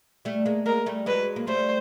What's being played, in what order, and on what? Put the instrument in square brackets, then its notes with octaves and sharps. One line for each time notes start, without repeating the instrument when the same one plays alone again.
[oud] G3 A3
G#3 A#3
[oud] G#3 A#3 [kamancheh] A#4
[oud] G3 A3
[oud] F#3 G#3 [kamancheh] B4
[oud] A#3
[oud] G3 A3 [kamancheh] C5